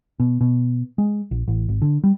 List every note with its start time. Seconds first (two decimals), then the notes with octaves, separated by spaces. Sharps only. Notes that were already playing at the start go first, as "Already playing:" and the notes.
0.20 B2
0.41 B2
0.98 G#3
1.31 A#1
1.48 A1
1.69 G#1
1.82 D3
2.04 G3